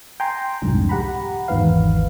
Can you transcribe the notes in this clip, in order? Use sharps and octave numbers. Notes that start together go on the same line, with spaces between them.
G5 G#5 A#5 C6
C2 F2 G#2 D3
G4 F#5 A#5 B5
G#1 E2 G#2 D#3 B4 F5